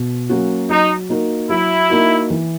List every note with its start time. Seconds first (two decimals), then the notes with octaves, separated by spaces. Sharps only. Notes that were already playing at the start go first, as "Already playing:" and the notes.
Already playing: B2
0.29 F#3 A#3 C#4 F#4
0.69 F#3 D#4
1.09 A#3 D#4 F#4 A#4
1.50 F#3 E4
1.90 A#3 D#4 F#4 A#4
2.30 E3